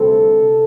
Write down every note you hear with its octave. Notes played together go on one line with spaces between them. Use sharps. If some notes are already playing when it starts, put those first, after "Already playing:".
Already playing: D2 C3 G3 C4 A4
C3